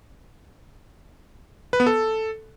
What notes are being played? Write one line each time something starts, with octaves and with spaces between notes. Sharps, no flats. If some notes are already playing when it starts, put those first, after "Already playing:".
B4
B3
A4